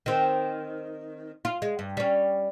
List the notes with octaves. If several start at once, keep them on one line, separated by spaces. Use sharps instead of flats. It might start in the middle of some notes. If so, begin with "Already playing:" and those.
D#3 C4
F4
G#3
G2
G3 C#4